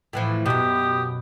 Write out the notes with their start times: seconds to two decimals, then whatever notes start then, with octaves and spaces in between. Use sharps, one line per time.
0.13 A2 E3 F3
0.46 F#2 B2 G4 D#6